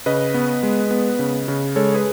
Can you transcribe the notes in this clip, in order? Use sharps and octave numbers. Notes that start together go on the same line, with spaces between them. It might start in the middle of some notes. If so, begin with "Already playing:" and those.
C#3 B4 D#5
B3
G#3
B3
C#3
C#3
G#3 A4 C#5
G#4 B4